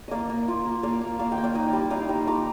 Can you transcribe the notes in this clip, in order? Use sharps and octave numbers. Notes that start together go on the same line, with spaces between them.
A#3 D5 D#5 F5
A#3
F4
A#3
A#3 D5 F5
A#3
A#3 D5 F5
D#5 G5
A#3
D5 F5
D#4 D5 F5
G3
D#4 D5 F5
G3
F4 A#5 D6